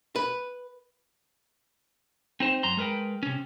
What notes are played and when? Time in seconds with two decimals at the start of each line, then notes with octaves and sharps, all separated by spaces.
0.16 B4
2.40 C4 D#4 C5
2.63 F#2 A#5 C6
2.77 G#3 A#4 B4 G5
3.23 C3 C#4